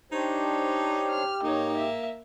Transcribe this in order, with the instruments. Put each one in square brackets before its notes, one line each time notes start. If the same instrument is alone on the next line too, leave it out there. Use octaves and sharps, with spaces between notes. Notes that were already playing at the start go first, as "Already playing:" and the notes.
[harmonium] D4 C5 C#5 [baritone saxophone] D#4 [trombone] G4
[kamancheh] F6
[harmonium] G#2 [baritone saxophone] A#3 [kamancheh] D#4 C#5
[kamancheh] E5